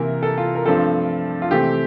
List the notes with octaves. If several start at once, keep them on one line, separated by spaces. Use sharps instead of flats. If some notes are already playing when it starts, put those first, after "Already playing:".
Already playing: C3 E3 A#3 A#4
A4
F4
A#4
G2 F3 A3 C4 A4
F4
C3 E3 A3 C4 G4